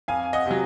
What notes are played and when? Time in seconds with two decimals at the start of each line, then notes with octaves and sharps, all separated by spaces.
0.08 F2 F5 G#5
0.33 D#5 F#5
0.46 C3 F#3